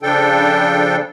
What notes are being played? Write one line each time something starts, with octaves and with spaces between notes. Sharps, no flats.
C#3 F3 D4 A4 G5